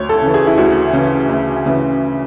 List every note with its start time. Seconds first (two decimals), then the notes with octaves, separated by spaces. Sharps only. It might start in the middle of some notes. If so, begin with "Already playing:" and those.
Already playing: D2 C#5
0.09 A4
0.22 C#3 E3
0.34 G#4
0.47 E4
0.58 D2 F#4
0.93 C#3 E3
1.29 D2
1.66 C#3 E3